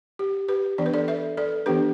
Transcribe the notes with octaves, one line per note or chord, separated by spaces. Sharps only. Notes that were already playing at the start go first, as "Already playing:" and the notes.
G4
G4 B4
E3 B3 D4 D5
B4
A4 D5
B4 E5
A4 D5
E3 B3 D4 G4 B4